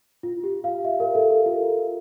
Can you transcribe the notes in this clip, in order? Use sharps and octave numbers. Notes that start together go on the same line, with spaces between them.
F4
G4
F5
E5
A#4
A4
A4
F4